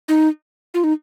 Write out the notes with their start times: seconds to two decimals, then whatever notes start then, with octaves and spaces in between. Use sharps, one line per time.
0.08 D#4
0.74 F4
0.84 D#4